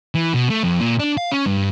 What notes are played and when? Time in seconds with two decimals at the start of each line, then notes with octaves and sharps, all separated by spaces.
0.15 E3
0.34 B2
0.50 A3
0.64 F2
0.79 A#2
0.99 D4
1.17 F5
1.32 C#4
1.46 G2